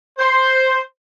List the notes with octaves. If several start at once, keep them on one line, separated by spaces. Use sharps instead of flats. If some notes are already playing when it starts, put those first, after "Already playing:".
C5